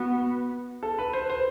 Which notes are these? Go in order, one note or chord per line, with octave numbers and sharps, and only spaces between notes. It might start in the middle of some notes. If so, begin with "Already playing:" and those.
Already playing: B3 F#4
A4
B4
C5
C5